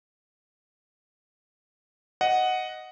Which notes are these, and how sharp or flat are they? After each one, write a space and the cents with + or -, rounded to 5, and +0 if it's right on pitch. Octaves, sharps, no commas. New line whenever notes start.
D#5 +0 F#5 +0